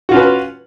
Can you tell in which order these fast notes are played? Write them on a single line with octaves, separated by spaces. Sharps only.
F#4 F4 C#4 B4